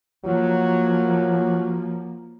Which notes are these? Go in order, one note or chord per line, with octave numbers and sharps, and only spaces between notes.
F3 F#3 A#3